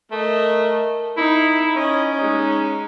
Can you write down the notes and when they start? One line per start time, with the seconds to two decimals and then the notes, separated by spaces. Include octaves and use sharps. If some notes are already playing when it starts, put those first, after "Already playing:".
0.11 A3 A#4 D#5
1.17 D#4 E4
1.76 C#4 D#5
2.18 G#3 D#4